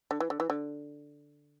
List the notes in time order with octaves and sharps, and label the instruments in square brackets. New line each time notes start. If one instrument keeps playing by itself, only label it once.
[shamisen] D3
E3
D3
E3
D3